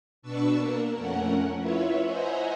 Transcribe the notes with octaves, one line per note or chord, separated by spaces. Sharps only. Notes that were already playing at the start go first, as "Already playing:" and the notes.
B2 D4 B4 A5 C#6 E6
A#3 A#4
F2 A3 C#4 A#4 F#5
E4 F4 B4 C#5 E5
C5 D#5 E5 F#5 G#5 A#5